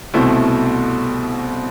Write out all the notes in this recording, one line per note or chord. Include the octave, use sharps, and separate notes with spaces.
C2 B2 A3 C4 E4